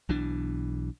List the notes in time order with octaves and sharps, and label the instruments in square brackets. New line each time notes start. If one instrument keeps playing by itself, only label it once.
[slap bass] B1 B2 E3 D4